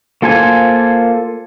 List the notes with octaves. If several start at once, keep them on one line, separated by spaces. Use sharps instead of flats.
A#3 F4 A4 C5 G#5